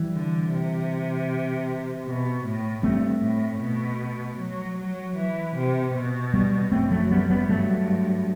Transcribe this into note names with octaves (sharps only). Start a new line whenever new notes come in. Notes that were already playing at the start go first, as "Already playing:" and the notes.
Already playing: E3 G3
D3
C3
B2
A2
G2 A3 C4
A2
B2
F#3
F#3
E3
C3
B2
G3 B3
F#2 A3 C4
F#3 A3
G3 B3
G3 B3
G2 F#3 A3